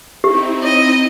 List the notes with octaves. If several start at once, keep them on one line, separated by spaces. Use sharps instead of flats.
C4 D#4 E4 G4
D#5